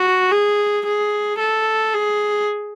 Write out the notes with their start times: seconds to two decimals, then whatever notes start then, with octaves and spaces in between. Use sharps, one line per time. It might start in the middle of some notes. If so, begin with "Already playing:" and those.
Already playing: F#4
0.31 G#4
0.85 G#4
1.39 A4
1.94 G#4